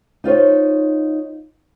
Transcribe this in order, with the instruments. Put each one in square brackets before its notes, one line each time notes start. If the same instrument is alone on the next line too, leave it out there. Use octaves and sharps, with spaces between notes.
[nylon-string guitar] D#4 F4 C5 C#5